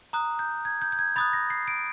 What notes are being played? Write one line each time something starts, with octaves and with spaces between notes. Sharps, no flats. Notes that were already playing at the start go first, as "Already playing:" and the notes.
A#5 D#6 F#6
G6
G#6
G6
G6
G#6
B5 D#6 F#6 A6
A#6
C7
D7